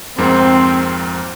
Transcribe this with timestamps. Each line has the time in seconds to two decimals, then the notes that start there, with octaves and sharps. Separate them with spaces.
0.18 F2 G#2 A#3 C4